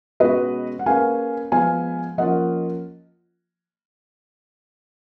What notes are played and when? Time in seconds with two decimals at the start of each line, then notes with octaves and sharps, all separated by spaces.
0.20 B2 G#3 C#4 F#4 B4 D#5
0.79 F#5
0.86 A#3 C#4 G#4 B4 F5 G#5
1.52 F3 G#3 B3 F5 G#5
2.18 F3 A#3 C#4 F4 D#5 F#5